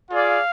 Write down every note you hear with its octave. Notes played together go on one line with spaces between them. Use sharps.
F4 G#4 D5 F5